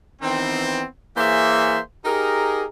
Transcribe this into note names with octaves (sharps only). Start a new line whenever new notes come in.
D#3 E3 B3 C4
E3 A#3 G#4 C5 C#5 E5
D#4 G4 G#4 A#4